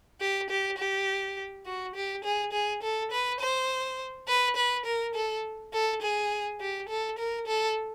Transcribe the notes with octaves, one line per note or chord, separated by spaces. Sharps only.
G4
G4
G4
F#4
G4
G#4
G#4
A4
B4
C5
B4
B4
A#4
A4
A4
G#4
G4
A4
A#4
A4